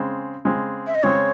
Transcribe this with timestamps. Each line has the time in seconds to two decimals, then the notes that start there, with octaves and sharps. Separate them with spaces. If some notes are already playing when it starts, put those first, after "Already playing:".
Already playing: C#3 G#3 C4
0.45 C#3 G#3 C4
0.87 E5
0.95 D#5
1.03 C#3 G#3 C4 C#5